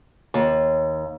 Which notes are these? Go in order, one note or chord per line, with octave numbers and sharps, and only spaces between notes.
D#2